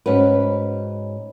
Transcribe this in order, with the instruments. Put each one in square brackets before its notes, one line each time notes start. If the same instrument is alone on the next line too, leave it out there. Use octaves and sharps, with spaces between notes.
[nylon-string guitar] G#2 C#4 F#4 B4